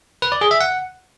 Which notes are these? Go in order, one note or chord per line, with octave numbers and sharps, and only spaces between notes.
B4
D5
G#4
E5
F#5